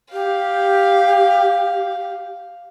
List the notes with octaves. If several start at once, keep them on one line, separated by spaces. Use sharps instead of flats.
G4 F5